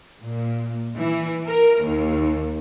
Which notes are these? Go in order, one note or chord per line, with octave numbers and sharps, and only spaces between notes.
A#2
E3
A#4
D#2